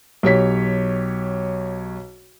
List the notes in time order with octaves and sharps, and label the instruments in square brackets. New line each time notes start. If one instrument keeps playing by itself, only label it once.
[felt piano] B1 G4 C#5 B6